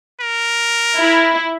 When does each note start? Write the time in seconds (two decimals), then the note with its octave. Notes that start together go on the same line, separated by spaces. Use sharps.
0.20 A#4
0.97 E4